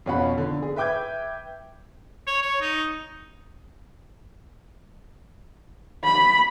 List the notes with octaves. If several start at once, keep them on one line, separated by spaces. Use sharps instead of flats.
F2 B2 C#4 F4 F#5 B5
D3
G#4
B4 E5 G5 D6 G6 G#6
C#5
C#5
D#4
B5